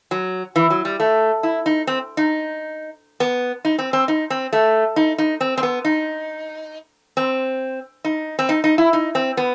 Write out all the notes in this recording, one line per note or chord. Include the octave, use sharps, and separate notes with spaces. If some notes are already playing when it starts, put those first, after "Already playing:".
F#3
E3
F#3
G3
A3
E4
D#4
C4
D#4
B3
D#4
C4
C4
D#4
C4
A3
D#4
D#4
C4
C4
B3
D#4
C4
D#4
C4
D#4
D#4
E4
D#4
C4
B3